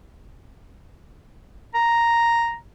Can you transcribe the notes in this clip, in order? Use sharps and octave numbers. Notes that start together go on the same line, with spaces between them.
A#5